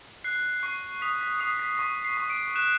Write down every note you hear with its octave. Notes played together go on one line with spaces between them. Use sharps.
F#6 C7
C#6 C7
D#6 B6
B6
D#6 C7
B6
C#6 B6
C7
C#6
D7
F#6 E7